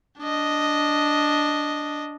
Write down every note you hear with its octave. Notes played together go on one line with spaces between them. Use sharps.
D4 D#5